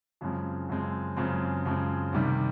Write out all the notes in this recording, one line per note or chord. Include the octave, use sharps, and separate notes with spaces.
F#2 C#3 F3 G#3 C4
F#2 C#3 F3 G#3 C4
F#2 C#3 F3 G#3 C4
F#2 C#3 F3 G#3 C4
C2 C3 D#3 G3